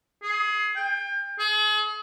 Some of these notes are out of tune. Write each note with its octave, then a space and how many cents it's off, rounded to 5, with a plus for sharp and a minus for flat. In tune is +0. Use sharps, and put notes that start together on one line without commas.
G#4 +25
G5 +30
G#4 +40